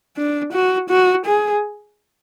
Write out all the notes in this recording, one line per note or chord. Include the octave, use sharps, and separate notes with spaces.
D4
F#4
F#4
G#4